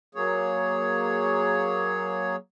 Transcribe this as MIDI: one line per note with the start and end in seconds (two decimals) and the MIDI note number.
0.15 2.36 54
0.15 2.36 58
0.15 2.36 68
0.15 2.36 73